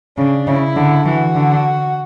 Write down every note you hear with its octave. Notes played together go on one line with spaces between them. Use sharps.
C#3 D4
C#3 E4
D3
E3 F#4
D3